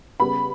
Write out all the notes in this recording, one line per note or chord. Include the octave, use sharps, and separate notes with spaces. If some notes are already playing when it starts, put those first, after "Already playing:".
C#3 G3 B3 B5